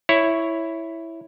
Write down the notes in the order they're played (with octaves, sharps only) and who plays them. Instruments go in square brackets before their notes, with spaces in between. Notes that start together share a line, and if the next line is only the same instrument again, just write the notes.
[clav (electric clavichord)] E4 C#5